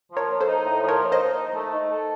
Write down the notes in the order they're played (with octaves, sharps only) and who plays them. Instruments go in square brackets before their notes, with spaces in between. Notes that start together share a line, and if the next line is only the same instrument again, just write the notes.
[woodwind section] F3
[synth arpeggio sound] A#4 C#5
[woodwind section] A#3
[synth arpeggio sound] A4 C5
[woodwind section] D#4
A2
F3
[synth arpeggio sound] A#4 C#5
[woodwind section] A#3
[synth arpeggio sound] C5 D#5
[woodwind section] D#4
D#3
A3
D#4
A4